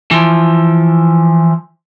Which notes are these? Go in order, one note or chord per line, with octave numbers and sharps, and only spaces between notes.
E3 F3